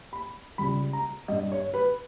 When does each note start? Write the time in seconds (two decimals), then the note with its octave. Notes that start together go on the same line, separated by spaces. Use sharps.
0.13 B5
0.58 C#2 C#3 G3 B5
0.93 A#5
1.28 G2 G3 D#5
1.52 C#5
1.74 B4